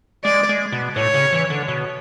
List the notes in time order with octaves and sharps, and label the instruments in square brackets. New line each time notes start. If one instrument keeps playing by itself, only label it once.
[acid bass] G#3 [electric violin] D5
[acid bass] G#3
B2
[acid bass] A2 [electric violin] C#5
[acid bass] C#3
E3
D3
B2